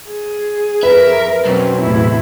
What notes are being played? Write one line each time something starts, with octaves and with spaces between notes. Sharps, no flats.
G#4
F2 A#4 B4 E5
B1 F#3 C4 C#4
E2 A2 C3 E4